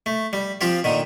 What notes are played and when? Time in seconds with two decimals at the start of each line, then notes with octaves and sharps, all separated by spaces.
0.06 A3
0.33 G3
0.61 F3 C4 F4 G4
0.84 A#2 D3 D#3